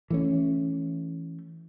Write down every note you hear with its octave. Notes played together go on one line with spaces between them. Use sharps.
E3 A3 C#4